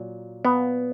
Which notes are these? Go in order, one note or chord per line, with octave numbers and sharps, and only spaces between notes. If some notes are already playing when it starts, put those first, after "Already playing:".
Already playing: A#2 F#3
B3